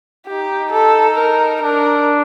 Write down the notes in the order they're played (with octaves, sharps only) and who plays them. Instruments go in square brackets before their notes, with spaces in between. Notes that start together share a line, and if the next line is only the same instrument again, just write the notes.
[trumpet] D#4 [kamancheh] G4
[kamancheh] A4
A#4
[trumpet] D4 [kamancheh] A#4